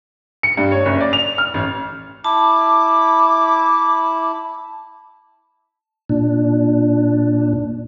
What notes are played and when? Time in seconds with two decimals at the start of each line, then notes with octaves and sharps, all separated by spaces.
0.43 C#7
0.57 G2
0.72 C#5
0.85 F#1
1.00 D5
1.13 F7
1.38 F6
1.54 A1
2.24 E4 A5 D6
6.09 A#2 D4